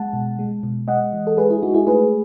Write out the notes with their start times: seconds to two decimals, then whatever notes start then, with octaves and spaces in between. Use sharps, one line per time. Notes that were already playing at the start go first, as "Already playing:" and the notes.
Already playing: G#3 F#5 A5
0.13 B2
0.39 G#3
0.63 B2
0.88 G#3 D#5 F#5
1.13 E3
1.27 A4
1.37 G#3 G#4 B4
1.50 E4 G#4
1.62 G#3 D#4 F#4
1.74 E4 G#4
1.87 A3 G#4 B4